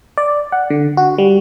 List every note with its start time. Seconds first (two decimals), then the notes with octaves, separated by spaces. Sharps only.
0.18 D5
0.52 F#5
0.70 D3
0.97 F#4
1.18 G3